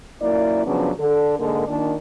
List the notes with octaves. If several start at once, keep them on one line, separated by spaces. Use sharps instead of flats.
F#2 A#2 A#3 E4 D5
C#3 F3 F#3 B3 C#4 D4
D3 A4
G#2 D3 G#3 A#3
A#2 D#3 D4